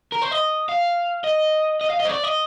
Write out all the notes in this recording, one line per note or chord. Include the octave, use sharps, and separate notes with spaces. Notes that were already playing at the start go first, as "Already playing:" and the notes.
A#4
C5
D#5
F5
D#5
D#5
F5
D#5
C5
D5
D#5